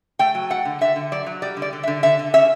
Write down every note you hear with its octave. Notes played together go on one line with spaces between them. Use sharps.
A3 G5
F#3
A3 F#5
D3
D3 E5
D3
F#3 D5
F#3
G3 D5
D3
D5
D3
E5
D3
D3 E5
D3
C#4 E5